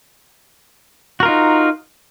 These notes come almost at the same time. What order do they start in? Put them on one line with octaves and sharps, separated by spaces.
F#4 A#4 F4 D#4